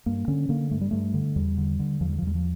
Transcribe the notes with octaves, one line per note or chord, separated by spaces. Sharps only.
G2 A#3
D3 C#4
D3 A#3
G2 A3
G3
G2 A3
D3
E2 G3
D3
D3
E2 F3
G3
F3
E2 G3
F3